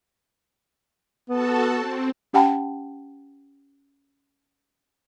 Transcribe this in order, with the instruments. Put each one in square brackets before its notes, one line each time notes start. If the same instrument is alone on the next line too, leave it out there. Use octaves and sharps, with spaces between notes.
[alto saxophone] B3 [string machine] F#4 A4 A5
[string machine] C4
[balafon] C#4 G4 F#5 G5 A5 B5